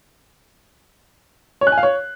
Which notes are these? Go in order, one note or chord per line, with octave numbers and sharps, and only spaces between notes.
C#5
F#6
G#5
F5
C#5